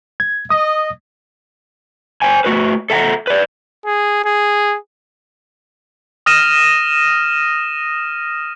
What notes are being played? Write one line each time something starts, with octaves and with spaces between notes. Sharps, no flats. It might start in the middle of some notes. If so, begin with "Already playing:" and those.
G#6
D#5 D#6
C5 G5 G#5
A3 F#4 B4
A4 E5 F#5 G#5 A#5
B4 D5
G#4
G#4
D#6 F6 A#6 D#7 E7